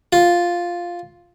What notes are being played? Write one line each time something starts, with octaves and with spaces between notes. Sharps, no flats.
F4